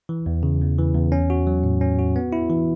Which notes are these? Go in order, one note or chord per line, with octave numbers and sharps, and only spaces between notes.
E3
E2
C#3
E2
E3
E2
C#4
F#4
F#3
A2
C#4
F#4
B3
E4
E3